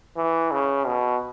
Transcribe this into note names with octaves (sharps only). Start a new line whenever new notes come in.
E3
C#3
B2